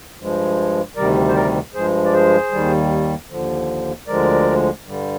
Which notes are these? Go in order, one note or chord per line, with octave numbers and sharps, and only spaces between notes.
G2 F3 G#3
D2 C3 D#3 G3 A#4 D5
C5
A#4 D5
G2 F3 G#3 G#4 C5
D5
G#4 C5
D#2 D#3 G3
D#2 D3 F3
D2 D3 F3 G#3 A#4 D5
G2 D3 G3